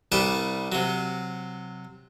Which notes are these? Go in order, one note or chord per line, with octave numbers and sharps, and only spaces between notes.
C2 G3 B4 A5 D6
C3 F#3